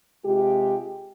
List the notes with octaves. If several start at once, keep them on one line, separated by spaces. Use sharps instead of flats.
C3 G#3 F4 G4